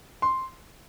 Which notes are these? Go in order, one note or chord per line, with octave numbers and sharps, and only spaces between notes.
C6